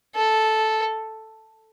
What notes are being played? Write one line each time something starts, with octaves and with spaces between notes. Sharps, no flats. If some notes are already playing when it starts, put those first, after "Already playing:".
A4